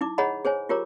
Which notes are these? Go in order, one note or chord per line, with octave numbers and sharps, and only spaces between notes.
D#4 E4 D6
G#4 C#5 D#5 F#5 A#5 B5
G#4 C5 C#5 G#5
F4 G4 A#4 C#5 A#5 D6